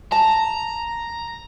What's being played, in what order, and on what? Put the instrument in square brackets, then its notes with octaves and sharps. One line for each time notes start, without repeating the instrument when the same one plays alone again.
[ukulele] A5 [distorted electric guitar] A#5